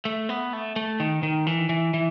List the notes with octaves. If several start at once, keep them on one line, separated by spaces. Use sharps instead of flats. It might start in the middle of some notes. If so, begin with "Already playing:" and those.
A3
B3
A3
A3
D#3
D#3
E3
E3
E3